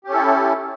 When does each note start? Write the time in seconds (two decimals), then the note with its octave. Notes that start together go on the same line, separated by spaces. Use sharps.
0.04 G4
0.08 C#4
0.11 A4
0.15 E4